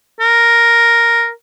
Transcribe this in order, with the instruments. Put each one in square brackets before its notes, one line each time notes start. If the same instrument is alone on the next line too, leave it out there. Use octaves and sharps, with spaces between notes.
[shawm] A#4